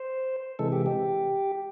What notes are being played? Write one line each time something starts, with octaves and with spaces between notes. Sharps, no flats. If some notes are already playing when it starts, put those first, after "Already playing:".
Already playing: C5
C3 E3 G#3 A4
G4
G4